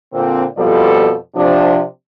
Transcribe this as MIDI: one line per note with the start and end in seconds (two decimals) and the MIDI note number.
0.14 0.44 46
0.14 0.44 50
0.14 0.44 60
0.57 1.15 41
0.57 1.15 47
0.57 1.15 53
0.57 1.15 55
0.57 1.15 69
0.57 1.15 74
1.35 1.82 48
1.35 1.82 53
1.35 1.82 62